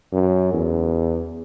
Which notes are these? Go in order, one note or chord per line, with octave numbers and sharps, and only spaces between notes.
F#2
E2